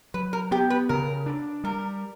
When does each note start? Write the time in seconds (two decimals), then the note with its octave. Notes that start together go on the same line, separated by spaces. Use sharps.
0.14 F#3 B4
0.33 A#4
0.51 B3 G4
0.70 B4
0.89 C#3 A#4
1.26 D4
1.64 G3 A#4